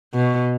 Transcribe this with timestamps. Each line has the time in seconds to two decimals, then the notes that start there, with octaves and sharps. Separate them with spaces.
0.14 B2